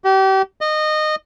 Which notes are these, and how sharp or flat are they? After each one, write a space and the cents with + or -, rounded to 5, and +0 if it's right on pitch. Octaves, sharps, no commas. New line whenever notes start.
G4 -35
D#5 -20